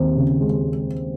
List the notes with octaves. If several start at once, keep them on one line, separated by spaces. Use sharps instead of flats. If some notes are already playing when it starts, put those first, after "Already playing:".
Already playing: D#2 C4 C5
C#3
G#3